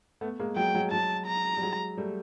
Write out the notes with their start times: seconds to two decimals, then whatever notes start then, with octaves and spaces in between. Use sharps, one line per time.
0.21 A3 B3
0.40 G#3 A#3
0.56 F#3 G#3 G5
0.74 F#3 G#3
0.92 F#3 G#3 A5
1.27 A#5
1.57 G3
1.62 F#3 G#3
1.97 G3 A3